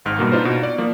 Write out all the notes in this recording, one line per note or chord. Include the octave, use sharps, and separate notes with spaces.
G#1 G#2 F6
G2 B2 A#3
D4 D#4 F4 B4 C5
B2
D5
F3 A#3